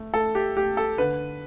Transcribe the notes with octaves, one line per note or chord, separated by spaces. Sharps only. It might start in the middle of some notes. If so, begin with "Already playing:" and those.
Already playing: A3
A3 A4
G4
A3 G4
A4
D3 B4